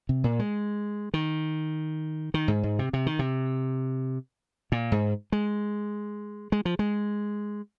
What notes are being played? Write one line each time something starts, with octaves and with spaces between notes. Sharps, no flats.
C3
A#2
G#3
D#3
D#3
G#2
G#2
C3
C3
D#3
C3
A#2
G#2
G#3
G#3
F3
G#3